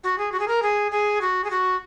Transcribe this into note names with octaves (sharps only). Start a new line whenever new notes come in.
F#4
G#4
F#4
G#4
A#4
G#4
G#4
F#4
G#4
F#4